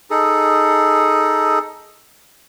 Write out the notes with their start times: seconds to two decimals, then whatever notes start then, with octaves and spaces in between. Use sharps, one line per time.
0.10 D#4 G#4 A4